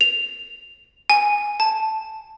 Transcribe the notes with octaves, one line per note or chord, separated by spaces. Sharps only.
F7
G#5
A5